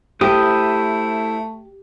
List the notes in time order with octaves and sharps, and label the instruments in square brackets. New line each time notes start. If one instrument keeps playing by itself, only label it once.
[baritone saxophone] A3 [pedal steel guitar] E4 C5 D#6 [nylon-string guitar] G4